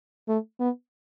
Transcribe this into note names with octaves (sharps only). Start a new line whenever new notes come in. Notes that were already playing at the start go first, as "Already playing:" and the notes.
A3
B3